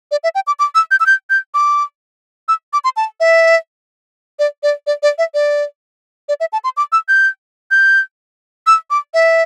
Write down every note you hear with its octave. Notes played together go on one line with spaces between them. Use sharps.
D5
E5
G5
D6
D6
E6
G6
E6
G6
G6
D6
E6
D6
C6
A5
E5
D5
D5
D5
D5
E5
D5
D5
E5
A5
C6
D6
E6
G6
G6
E6
D6
E5